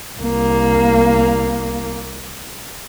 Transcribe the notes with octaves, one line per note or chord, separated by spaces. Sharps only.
C2 A#3